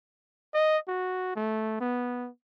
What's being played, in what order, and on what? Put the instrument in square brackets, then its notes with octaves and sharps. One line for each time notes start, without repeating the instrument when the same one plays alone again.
[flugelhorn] D#5
F#4
A3
B3